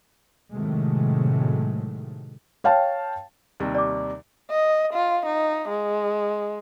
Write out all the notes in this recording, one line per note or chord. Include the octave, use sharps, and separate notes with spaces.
A2 C3 D#3 F#3 G#3 A3
C#5 F5 G5 A5
D#2 C3 G3
D5 D6
D#5
F4
D#4
G#3